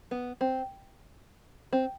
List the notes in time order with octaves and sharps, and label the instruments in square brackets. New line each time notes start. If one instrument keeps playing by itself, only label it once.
[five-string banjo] B3
C4
C4